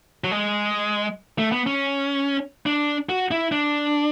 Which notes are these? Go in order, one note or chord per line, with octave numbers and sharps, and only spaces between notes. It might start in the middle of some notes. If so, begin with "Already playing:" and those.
F#3
G#3
A3
B3
C#4
D4
F#4
E4
D4